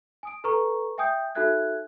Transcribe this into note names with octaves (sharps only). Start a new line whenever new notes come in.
G#5 D#6 D7
A4 B4 A#5 C#6
E5 G5 G#5 D#6 G6
D#4 F#4 A4 E5 F#6 G#6